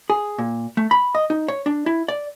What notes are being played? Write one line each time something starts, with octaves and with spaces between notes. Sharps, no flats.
G#4
A#2
A3
B5
D#5
D#4
C#5
D4
E4
D5